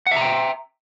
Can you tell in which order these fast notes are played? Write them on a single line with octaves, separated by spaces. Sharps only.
F#5 E5 A#5 G5